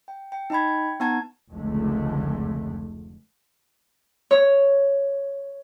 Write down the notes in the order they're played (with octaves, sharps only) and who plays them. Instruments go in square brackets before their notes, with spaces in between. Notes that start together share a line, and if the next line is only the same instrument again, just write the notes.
[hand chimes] G5
G5
D#4 D#5 G5 B5 G#6
G5
B3 D#4 F#5 A5 A#5 G#6
[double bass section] F1 C#2 D3 G#3 A3
[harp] C#5